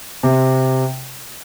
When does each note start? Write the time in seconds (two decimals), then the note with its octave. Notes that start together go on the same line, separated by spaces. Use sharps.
0.23 C3